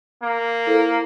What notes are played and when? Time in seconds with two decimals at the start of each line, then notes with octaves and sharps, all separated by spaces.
0.23 A#3
0.67 E4 A4 C5